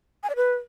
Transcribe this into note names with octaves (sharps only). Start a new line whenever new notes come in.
G#5
D5
B4